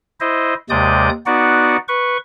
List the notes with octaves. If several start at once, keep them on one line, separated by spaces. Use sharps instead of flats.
E4 C5 D#5
D#2 C3 G#3 D5 D#6 G6
B3 D#4 F#4 D5 F#5
B4 C#6